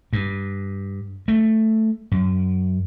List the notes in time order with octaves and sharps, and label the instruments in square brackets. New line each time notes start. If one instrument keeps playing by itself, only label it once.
[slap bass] G2
A3
F#2